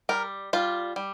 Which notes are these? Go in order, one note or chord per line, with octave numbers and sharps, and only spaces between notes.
G3 A#4
G3 F4
G3